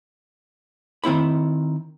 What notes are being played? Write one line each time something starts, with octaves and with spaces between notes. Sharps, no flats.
D#3 C4 E4 B5